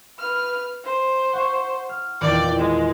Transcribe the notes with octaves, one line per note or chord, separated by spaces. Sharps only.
B4 F6
C5
F#5 C#6
F6
D#1 E2 D5 G5
G#3